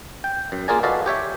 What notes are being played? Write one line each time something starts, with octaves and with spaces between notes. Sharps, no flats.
G5
F#2
A#3 F4 G#4 A#4 D5 G#5
F#4 A4 B4 D5 D#5 F5
G4 C#5 E5 G5